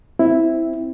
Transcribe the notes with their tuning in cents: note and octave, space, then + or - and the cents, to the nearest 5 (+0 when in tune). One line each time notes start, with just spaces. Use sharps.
C4 +0 E4 +0